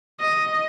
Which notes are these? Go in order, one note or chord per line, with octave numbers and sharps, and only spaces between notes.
D#5